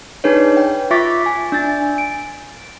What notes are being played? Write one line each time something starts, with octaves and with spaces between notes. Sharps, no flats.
D4 D#4 G#4 B4 C#5
G5
F4 E5 C#6 D6 A6 B6
G#5
D4 G#5 A6
D7